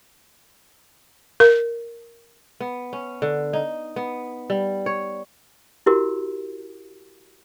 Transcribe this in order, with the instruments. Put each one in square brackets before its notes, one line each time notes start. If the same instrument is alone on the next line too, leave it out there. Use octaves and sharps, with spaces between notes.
[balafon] A#4
[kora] B3
C#4
D3
D#4
B3
G3
C#5
[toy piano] E4 F#4 G4 A#4